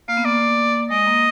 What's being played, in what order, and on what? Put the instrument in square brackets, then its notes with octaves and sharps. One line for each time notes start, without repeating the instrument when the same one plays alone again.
[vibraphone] A#3 [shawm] F5
[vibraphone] B3
[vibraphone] A#3 [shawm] D5
[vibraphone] G#3 [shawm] D#5
[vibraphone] A#3